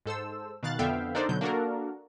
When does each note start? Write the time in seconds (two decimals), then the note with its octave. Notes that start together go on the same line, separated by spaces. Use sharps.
0.06 G#2 A4 C5 E6
0.63 B2 D#3 F5 F#6 A6
0.79 F2 D3 B3 E5 F5 G5
1.15 D4 D#4 A4 A#4 C5 D5
1.29 B2 D3 F#3 G6
1.41 A#3 D4 F#4 A4 A#4